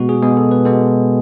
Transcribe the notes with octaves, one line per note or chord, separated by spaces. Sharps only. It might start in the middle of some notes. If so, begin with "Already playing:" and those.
Already playing: B2 G#3 B3 F#4
G#4
B2 G#3 B3 G#4
A4
B4
B2 G#3 B3 A4